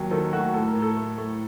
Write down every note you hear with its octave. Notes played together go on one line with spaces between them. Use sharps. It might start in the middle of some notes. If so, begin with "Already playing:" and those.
Already playing: D#2 F#3 A#4
D#3 A4
A3 F#4
A2 A4
A#4
A2
A4
A3
A3